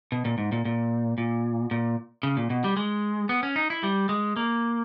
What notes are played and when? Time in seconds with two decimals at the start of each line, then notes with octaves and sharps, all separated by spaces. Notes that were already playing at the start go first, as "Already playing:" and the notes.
0.12 B2
0.25 A#2
0.38 G#2
0.52 A#2
0.65 A#2
1.18 A#2
1.71 A#2
2.23 C#3
2.37 A#2
2.50 B2
2.64 G3
2.77 G#3
3.29 B3
3.43 C#4
3.56 D#4
3.70 E4
3.83 G3
4.09 G#3
4.36 A#3